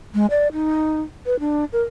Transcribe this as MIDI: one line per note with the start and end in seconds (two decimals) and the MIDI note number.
0.14 0.26 56
0.30 0.48 74
0.53 1.01 63
1.26 1.39 71
1.40 1.65 62
1.73 1.82 70